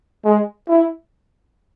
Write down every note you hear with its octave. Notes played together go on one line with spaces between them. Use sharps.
G#3
E4